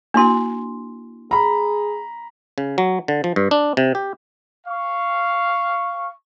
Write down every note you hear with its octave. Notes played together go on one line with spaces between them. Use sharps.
A#3 D4 E4 F#4 C6
G#4 A#5 B5
C#3
F#3
D3
F3
G2
D4
C3
G4
F5 C#6